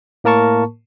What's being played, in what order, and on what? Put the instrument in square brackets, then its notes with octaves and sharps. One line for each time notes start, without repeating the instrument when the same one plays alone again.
[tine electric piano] A2 A#3 A#4 A5 C#6